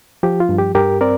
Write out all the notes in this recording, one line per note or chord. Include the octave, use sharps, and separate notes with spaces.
F3 G4
F4
G2
G4
G2 G4 A#4
C4 A#4 D5